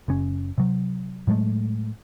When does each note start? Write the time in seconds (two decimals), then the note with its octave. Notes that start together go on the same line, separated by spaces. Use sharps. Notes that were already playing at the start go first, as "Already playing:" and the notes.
0.08 F#1 C#3 C#4
0.58 C3 F#3
1.27 A2 F#3 G#3 A3